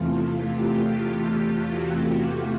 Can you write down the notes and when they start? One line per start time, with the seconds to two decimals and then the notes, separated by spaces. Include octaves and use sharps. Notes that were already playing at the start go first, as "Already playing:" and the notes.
Already playing: E2 C3 E3 A3 F4
0.16 F4
0.46 G4
1.70 F#4